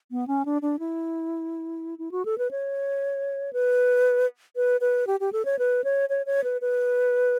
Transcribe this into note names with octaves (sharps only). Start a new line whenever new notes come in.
B3
C#4
D4
D4
E4
E4
F#4
A4
B4
C#5
B4
B4
B4
G4
G4
A4
C#5
B4
C#5
C#5
C#5
B4
B4